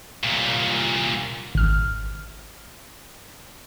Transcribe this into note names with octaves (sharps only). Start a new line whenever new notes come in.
C2 A#2
G#1 F6